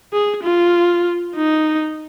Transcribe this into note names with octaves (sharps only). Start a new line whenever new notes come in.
G#4
F4
D#4